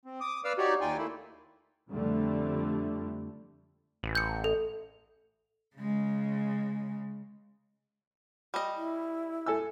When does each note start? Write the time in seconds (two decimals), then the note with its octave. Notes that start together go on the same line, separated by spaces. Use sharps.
0.05 C4
0.20 D6 D#6
0.45 B4 D5 F5 D6 E6 F6
0.58 D#4 F#4 G4 C#5 D5
0.81 D#2 D#4 F4 D5 G5 G#5
0.97 A3 A#3 E4
1.89 F2 D3 G3 A3
4.03 A1
4.15 G6 C#7
4.44 A4
5.76 C#3 G#3
8.54 G3 D#5
8.76 E4
9.46 A4 G#5 E6